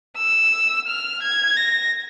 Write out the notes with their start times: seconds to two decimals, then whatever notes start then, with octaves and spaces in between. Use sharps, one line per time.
0.18 E6
0.88 F6
1.22 G#6
1.57 A#6